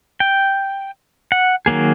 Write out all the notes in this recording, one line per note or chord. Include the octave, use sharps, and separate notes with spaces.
G5
F#5
D#3 F#3 A#3 G#4